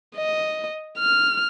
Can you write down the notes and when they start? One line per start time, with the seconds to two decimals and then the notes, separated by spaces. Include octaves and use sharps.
0.16 D#5
0.99 F6